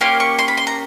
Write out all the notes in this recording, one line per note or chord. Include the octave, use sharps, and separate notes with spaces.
A#3 C#4 G4 C6
C#6
C6
B5
C6
A#5